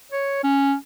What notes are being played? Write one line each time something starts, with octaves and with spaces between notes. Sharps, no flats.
C#5
C#4